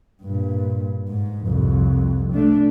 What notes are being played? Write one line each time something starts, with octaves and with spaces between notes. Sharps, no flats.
G2 A#2
G#2
C2 F2
A3 D4